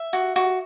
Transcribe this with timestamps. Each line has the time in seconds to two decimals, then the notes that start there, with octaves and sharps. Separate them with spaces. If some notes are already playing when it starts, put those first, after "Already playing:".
Already playing: E5
0.13 F#4
0.36 F#4